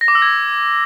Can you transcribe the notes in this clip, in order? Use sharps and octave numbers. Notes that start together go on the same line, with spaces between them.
A#6
D6
E6
G#6